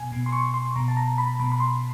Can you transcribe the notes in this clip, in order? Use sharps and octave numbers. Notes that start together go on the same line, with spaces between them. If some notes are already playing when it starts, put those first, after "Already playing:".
Already playing: B2 G#5
B2
C6
C#6
C6
B2 A#5
A5
A#5
B5
B2 B5
B5
C6